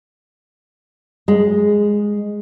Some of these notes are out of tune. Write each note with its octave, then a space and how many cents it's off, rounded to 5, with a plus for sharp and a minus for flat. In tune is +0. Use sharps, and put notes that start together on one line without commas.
G#3 -5